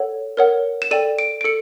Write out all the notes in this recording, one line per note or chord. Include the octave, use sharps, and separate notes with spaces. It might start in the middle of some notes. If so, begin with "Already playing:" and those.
Already playing: A4 C#5 F#5
A#4 C#5 F#5
E7
A4 D5 G5 D#7
D7
D7
A4 C#7